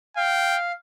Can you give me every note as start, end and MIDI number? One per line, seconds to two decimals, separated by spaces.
0.17 0.72 77
0.17 0.57 79